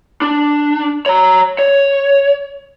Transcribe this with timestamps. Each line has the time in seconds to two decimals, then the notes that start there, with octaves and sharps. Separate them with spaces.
0.22 D4
1.06 C#5 A#5
1.59 C#5